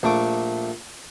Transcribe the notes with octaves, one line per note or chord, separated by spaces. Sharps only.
A#1 A3 D6